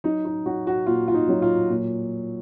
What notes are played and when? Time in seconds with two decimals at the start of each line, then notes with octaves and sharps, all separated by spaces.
0.04 F#3 D#4
0.25 D#4
0.46 F#3 F#4
0.67 F#4
0.87 A#2 F4
1.08 F4
1.14 D#4
1.29 F#3
1.42 F4
1.70 A#2